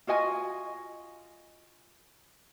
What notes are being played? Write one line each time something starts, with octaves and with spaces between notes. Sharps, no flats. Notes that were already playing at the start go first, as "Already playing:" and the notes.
F4 F#4 D#5 G#5